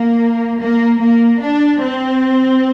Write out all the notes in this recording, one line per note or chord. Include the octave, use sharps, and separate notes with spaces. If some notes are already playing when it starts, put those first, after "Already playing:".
Already playing: A#3
A#3
A#3
D4
C4